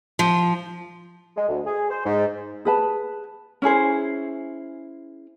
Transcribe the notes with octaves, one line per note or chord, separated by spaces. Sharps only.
F3
G#3
D2
G#4
C5
G#2
G#4 B4 A5
C#4 E4 G#4 C5